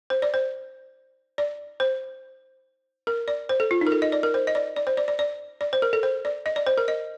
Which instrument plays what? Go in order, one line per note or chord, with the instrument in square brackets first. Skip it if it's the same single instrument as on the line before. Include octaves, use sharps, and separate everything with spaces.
[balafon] C5
D5
C5
D5
C5
A#4
D5
C5
A4
F4
D#4
A#4
A4
D#5
D5
A#4
C5
D#5
D5
D5
C5
D5
D5
D5
D5
C5
A#4
A4
C5
D5
D#5
D5
C5
A#4
D#5